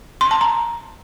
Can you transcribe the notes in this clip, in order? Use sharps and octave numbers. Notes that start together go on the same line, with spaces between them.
C6
A5
A#5